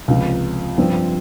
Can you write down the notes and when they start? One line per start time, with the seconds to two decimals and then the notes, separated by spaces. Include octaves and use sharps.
0.08 C#2 C3 F3
0.78 G2 F3 C4 F4